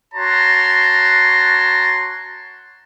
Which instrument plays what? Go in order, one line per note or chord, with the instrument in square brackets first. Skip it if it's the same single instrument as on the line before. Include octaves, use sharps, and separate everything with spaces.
[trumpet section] F#4 C#5 A5 A#5 C6